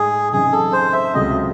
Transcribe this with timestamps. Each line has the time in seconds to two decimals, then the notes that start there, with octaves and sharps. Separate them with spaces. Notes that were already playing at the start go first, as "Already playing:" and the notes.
Already playing: A2 G#3 D#4 G#4
0.33 F#2 C#3 E3 C4 D#4 G#4
0.52 A4
0.73 C5
0.93 E5
1.14 C#2 C#3 F#3 A3 C4 D#5